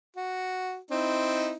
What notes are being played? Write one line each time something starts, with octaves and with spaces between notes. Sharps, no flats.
F#4
C4 D#4 E4